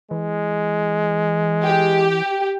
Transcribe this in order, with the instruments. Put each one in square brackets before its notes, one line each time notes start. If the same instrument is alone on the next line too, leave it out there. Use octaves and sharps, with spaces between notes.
[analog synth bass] E3 [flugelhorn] G#3
[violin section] G4